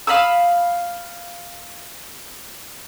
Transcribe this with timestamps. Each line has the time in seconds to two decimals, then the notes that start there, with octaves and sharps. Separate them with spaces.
0.07 F5 B5 D#6 E6